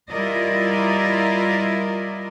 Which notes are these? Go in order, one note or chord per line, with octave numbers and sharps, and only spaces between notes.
G3 E4 F4 A#4 D5 D#5